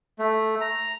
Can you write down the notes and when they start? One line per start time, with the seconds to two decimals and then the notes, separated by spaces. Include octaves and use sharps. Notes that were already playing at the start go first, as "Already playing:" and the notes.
0.19 A3
0.61 A#5